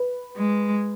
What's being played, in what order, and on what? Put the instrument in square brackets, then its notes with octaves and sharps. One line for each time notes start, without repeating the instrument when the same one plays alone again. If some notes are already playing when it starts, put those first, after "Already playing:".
Already playing: [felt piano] B4
[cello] G#3